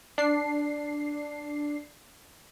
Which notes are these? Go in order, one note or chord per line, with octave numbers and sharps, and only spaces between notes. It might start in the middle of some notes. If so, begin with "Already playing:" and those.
D4 C7